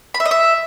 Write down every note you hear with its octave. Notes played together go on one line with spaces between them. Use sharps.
B5
E5
D#5
E5